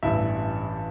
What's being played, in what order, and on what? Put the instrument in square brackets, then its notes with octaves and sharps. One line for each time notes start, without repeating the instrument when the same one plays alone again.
[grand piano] A1 G2 E3 E5